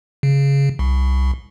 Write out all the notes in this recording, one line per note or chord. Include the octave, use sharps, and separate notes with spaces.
C#3
C2